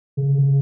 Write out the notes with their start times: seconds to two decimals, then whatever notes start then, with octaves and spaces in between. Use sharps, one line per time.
0.17 C#3
0.38 C#3